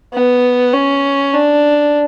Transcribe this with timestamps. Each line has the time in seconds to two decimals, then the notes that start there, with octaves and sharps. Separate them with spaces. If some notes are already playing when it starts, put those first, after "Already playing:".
0.14 B3
0.74 C#4
1.34 D4